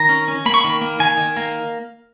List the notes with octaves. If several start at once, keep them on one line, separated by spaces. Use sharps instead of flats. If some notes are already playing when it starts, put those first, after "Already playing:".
Already playing: D#3 A#5
C#4
C#4
A#3 B5
C#6
D#3 B5
A#3
D#3 G#5
D#3
A#3